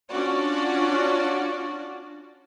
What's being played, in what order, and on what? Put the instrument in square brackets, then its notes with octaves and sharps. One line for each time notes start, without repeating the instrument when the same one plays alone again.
[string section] C#4 D4 F4 F#4 D5